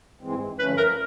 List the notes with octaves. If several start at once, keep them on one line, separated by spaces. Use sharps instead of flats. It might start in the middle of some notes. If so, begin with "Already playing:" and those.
G2 E3 G#3 C4
G2 D3 F3 A3 C#4 B4
A#4